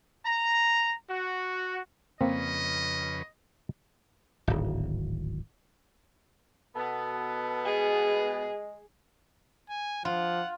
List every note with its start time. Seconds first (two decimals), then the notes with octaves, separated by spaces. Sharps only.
0.25 A#5
1.09 F#4
2.21 F2 C#3 A#3 C4 B4 D#5
4.47 D1 G#1
6.76 B2 B3 A4
7.65 G#3 G#4
9.70 G#5
10.05 F3 F4 F#5